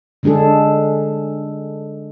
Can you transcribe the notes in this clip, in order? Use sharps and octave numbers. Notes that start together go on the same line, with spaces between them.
D3 G#3 D4 G#4 A4